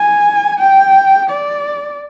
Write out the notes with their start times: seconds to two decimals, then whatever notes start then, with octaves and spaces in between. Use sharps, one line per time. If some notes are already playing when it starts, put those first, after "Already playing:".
Already playing: G#5
0.60 G5
1.30 D5